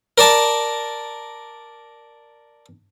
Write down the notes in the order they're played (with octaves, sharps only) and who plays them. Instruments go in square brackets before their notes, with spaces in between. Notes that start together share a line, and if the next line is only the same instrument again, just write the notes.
[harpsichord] A#4 D5 A5